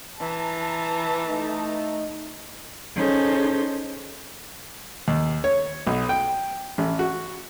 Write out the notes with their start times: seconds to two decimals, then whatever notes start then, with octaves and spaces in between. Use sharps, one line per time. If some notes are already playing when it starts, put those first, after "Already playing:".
0.20 E3 A5 A#5
1.28 A3 D#4
2.95 C#4 D#4 G#4 A4 C5
5.08 D#2
5.44 C#5
5.87 B1
6.09 G5
6.78 A1
6.99 F#4